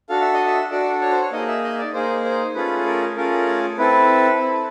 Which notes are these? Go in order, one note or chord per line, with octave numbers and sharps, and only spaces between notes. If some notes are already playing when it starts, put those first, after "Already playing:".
D4 F#4 A4 F5
E5
D#5
E5
D4 F#4 A4 D5
C#5
C5
C#5
A#3 D#4 G#4 D#5
E5
D#5
D5
A#3 D#4 G#4 C5
C5
A3 C#4 F4 G#4 B4
A#4
A3 C#4 F4 G#4 A#4
C4 E4 A4 B4
C4 E4 A4